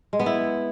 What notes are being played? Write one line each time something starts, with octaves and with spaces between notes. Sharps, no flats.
G#3
B3
E4